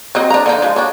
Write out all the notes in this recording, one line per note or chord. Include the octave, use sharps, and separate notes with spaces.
F#3 C4 D#5
D4 A#5
D3 F3 D#4
F3 G#3
F#3 D4